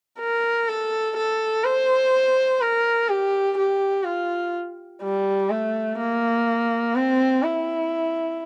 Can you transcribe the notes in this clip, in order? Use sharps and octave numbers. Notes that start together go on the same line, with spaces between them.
A#4
A4
A4
C5
A#4
G4
G4
F4
G3
A3
A#3
C4
E4